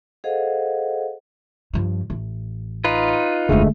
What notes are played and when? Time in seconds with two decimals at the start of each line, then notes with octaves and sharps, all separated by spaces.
0.24 G#4 A4 C5 D#5 F5 F#5
1.74 G2 F3
2.10 A1
2.84 D#4 F4 B4
3.49 D#1 F#2 D3 G#3 A3